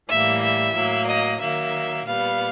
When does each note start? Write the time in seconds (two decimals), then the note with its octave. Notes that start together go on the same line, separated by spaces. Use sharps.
0.10 A2 E3 G3 A#3 E5
0.43 E5
0.75 A2 F#3 A#3
1.08 D#5
1.41 D#3 F#3 A#3 E5
2.06 A#2 G3 B3 F5